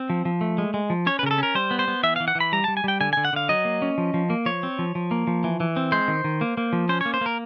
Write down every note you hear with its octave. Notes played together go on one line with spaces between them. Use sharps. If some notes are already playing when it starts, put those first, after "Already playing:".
Already playing: C4
F3
F3
A3
G#3
G#3
F3
C#4 C#5
B4
C#3 A#4
A4
C#4 A#4
G3 C5
B3
C5
B3
E3 E5
E3 F5
F#5
E3
B5
G3 A#5
G3 A5
G#5
G3 G5
D3 G#5
D3 G#5
F#5
D3 F5
F#3 D#5
A#3
C#4
F3
F3
A#3
F3 C#5
C4
F3
F3
A#3
F3
E3
E3
C4
G#3 C5
D#3
D#3
A#3
A#3
F3
C#4 C5
A#3 C#5
C5
A#3 A#4